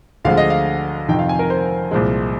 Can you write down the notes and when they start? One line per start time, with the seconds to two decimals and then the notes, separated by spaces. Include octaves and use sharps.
0.25 D2 D3 F3 G#3 F5
0.37 D#5
0.50 F5
1.08 F2 C3 D#3 G5
1.19 F5
1.29 G#5
1.39 A#4
1.50 C5
1.91 C2 A#2 F3 G#3